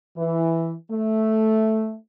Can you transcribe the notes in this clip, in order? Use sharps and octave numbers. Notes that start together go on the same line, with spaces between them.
E3
A3